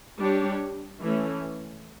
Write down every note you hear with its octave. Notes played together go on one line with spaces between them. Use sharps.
G3 D4 G4 C#5
E3 A3 C#4